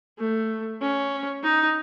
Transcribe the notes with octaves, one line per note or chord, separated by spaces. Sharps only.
A3
C#4
D#4